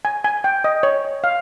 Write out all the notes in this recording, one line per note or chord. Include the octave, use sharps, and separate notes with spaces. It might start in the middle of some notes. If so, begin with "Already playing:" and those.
G#5
G#5
G5
D#5
C#5
F5